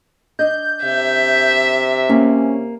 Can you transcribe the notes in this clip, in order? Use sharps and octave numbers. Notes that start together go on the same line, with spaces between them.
D4 D#5 G6
C3 E5
A#3 C#4